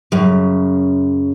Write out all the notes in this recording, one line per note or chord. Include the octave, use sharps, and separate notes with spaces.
F#2 C#3